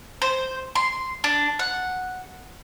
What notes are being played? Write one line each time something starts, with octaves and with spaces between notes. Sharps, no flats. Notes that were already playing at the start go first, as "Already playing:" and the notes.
C5
C6
D4
F#5